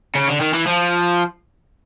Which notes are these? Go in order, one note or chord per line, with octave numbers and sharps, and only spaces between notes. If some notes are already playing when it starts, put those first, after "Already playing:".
C#3
D3
D#3
E3
F3